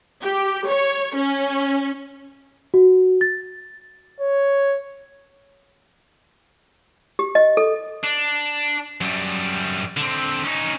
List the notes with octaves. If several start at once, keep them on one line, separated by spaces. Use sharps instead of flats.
G4
C#5
C#4
F#4
A6
C#5
G4
D#5
A4
D4
F#2 G3
D3 C4
C#4 D#4